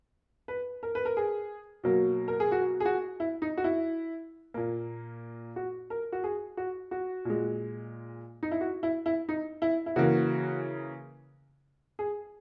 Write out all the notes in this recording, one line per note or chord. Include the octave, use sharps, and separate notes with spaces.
B4
A#4
B4
A#4
G#4
B2 F#3 A#3
A#4
G#4
F#4
G#4
F#4
E4
D#4
F#4
E4
A#2 A#3
F#4
A#4
F#4
G#4
F#4
F#4
A#2 G#3
D#4
E4
F#4
E4
E4
D#4
E4
E4
C#3 E3 A#3 F#4
G#4